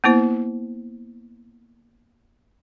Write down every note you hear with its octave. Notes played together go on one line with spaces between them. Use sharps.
A#3 B3 E4 C5